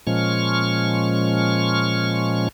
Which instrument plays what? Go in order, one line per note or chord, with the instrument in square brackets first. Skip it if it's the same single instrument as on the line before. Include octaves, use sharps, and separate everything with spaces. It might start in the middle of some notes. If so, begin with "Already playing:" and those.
[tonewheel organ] A#2 F3 G#3 C#4 C#6 F6